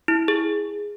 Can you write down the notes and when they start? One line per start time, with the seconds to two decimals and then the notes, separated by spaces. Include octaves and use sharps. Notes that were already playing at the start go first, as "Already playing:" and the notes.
0.08 E4
0.28 G#4